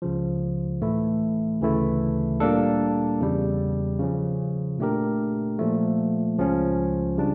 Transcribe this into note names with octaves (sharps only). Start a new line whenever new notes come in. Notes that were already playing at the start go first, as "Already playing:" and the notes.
C#2 C#3 F3
A2 E3 A3 E4
D2 C#3 E3 A3 E4
A#2 G3 A#3 D4 A4
E2 C#3 G3
C#3 F3 C#4
A#2 A3 D4 G4 A#4
A#2 F3 A3
C#2 C#3 F3 C#4
C#3 G3 D4